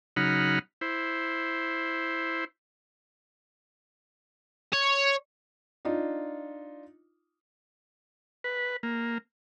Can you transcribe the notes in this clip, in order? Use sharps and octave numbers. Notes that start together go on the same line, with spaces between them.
C#3 F#3 D#4 F#5 B5 F6
E4 C5
C#5
D4 D#4 F4
B4
A#3